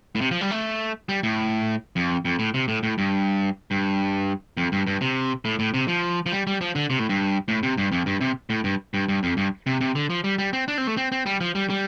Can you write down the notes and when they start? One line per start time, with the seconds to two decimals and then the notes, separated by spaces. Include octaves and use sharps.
0.15 A2
0.21 C3
0.31 F3
0.41 G3
0.51 A3
1.09 G3
1.23 A2
1.96 F2
2.25 F2
2.39 A2
2.54 C3
2.68 A2
2.83 A2
2.98 G2
3.71 G2
4.57 F2
4.72 G2
4.87 G2
5.01 C3
5.45 A2
5.59 A2
5.74 C3
5.88 F3
6.26 F3
6.32 G3
6.47 G3
6.61 F3
6.75 D3
6.90 C3
6.99 A2
7.09 G2
7.48 A2
7.63 C3
7.78 G2
7.92 F2
8.06 G2
8.21 C3
8.50 A2
8.64 G2
8.94 G2
9.09 G2
9.23 F2
9.37 G2
9.66 C3
9.81 C3
9.95 D3
10.10 F3
10.24 G3
10.38 G3
10.53 C4
10.68 D4
10.78 C4
10.87 A3
10.97 C4
11.12 C4
11.26 G3
11.41 F3
11.55 G3
11.70 G3